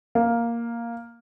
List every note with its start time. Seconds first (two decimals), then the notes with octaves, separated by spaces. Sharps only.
0.15 A#3